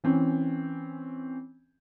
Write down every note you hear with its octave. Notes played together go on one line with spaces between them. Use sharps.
E3 C4 C#4